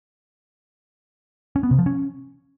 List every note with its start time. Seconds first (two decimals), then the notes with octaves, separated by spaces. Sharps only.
1.56 C#4
1.63 B3
1.71 C3
1.78 F3
1.86 C#4